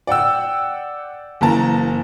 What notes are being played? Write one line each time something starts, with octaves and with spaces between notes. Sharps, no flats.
D5 F#5 G5 E6
F#1 E3 A#3 A5 A#5